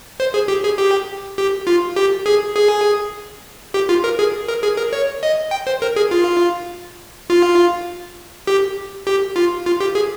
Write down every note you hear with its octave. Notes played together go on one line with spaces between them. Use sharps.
C5
G#4
G4
G#4
G4
G4
F4
G4
G#4
G#4
G4
F4
A#4
G#4
A#4
G#4
A#4
C#5
D#5
G5
C5
A#4
G#4
F4
F4
G4
G4
F4
F4
G4
G#4